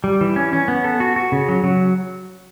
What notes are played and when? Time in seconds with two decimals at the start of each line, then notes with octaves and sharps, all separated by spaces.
0.04 G3
0.21 E3
0.36 C#4
0.53 C#4
0.68 B3
0.84 A4
1.00 F#4
1.16 F#4
1.32 C#3
1.48 F#3
1.64 F#3